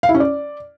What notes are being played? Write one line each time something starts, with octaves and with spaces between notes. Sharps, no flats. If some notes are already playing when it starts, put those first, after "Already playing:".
F5
E4
C#4
D5